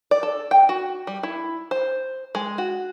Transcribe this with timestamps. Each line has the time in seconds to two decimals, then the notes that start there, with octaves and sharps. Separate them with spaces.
0.11 D5
0.23 A4
0.51 G5
0.69 F#4
1.07 G3
1.23 E4
1.71 C5
2.35 G#3
2.58 F#4